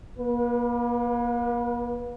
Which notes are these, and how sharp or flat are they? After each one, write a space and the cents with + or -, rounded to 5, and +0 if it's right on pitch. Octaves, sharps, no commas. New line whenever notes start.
A#3 +35 B4 -25